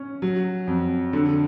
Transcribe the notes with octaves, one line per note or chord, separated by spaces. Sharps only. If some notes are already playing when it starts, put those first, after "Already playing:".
Already playing: C#4
F#3
F2
D3